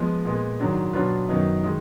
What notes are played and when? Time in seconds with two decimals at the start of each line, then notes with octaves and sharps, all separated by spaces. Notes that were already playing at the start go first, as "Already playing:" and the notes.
Already playing: F3 G#3 B3
0.25 A#2 G#3 B3
0.60 G#2 D#3 F#3 D4
0.93 B2 F#3 D4 F4 B4
1.29 F#2 D#3 F#3 B3 D#4
1.64 D#3 G#3